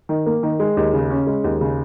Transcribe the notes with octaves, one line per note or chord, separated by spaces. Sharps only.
D#3
A#3
D#3
G#3
D#2
C#3
C#4
G#3
D#2
C#3